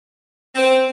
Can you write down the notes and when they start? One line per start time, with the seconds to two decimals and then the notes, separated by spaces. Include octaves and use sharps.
0.55 C4